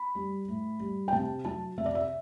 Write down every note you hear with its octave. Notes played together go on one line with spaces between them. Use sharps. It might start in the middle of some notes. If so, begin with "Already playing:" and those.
Already playing: B5
G3
A2
G3
G5
C3 A5
F#3 A5
C3 E5
D5
E5